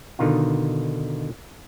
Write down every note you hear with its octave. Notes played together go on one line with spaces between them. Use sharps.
B2 D3 D#3 D#4 F4